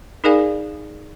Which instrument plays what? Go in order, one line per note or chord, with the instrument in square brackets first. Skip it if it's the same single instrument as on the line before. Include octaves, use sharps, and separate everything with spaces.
[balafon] D#4 G#4 A#4 D5 F5 G#5